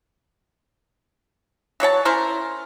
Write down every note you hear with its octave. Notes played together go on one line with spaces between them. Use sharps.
E3 F#3 C#5 A5
C#4 E4 A#4 C5